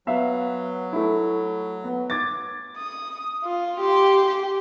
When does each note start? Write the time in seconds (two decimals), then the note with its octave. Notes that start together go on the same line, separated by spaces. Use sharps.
0.07 F#3 B3 E5 F5
0.93 A3 E4
1.84 B3
2.10 D6 G#6 A6
2.77 D#6
3.44 F4
3.80 G4 C6
4.26 G4